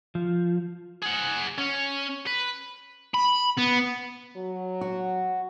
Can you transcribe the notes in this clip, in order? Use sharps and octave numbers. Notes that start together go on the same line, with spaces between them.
F3
G#4 F#5
C#4
B4
B5
B3
F#3
F#4